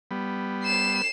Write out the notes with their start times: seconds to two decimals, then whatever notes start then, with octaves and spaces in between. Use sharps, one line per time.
0.11 G3 B3
0.64 C7 E7